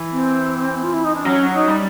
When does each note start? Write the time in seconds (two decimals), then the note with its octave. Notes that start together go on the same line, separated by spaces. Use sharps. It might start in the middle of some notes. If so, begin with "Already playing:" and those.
Already playing: E3
0.12 C4
0.83 F4
0.93 E4
1.04 D#4
1.14 D4
1.24 F#3 C#4
1.53 D#4
1.68 G3